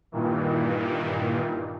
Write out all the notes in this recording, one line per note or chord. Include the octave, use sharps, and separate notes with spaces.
G2 A#2 D#3 E3